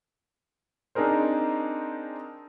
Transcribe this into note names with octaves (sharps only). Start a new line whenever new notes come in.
C4 D4 D#4 G#4 A#4 C5